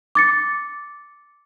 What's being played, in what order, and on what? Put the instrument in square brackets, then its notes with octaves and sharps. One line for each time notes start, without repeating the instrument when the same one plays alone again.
[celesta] D6 A6 C#7